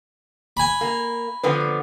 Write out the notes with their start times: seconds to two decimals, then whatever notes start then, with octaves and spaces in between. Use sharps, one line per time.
0.57 G#5 B5
0.81 A#3
1.44 D3 F3 B3 B4